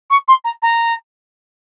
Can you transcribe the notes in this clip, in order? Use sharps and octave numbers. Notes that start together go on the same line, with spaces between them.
C#6
C6
A#5
A#5